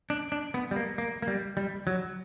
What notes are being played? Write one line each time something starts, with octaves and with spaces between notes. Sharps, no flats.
D4
D4
B3
G3
A#3
A#3
A#3
G3
G3
F#3